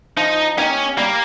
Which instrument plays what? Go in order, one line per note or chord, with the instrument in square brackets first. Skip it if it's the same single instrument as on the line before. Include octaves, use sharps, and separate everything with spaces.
[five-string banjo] F3 [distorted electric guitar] D#4
[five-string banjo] A#3 D#4 G4 [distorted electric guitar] C#4
[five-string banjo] G3 [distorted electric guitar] A#3